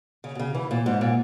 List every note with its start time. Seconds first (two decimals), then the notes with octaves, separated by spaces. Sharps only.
0.24 C#3
0.35 B2
0.39 C#3
0.55 E3
0.71 A#2
0.86 G#2
1.01 A#2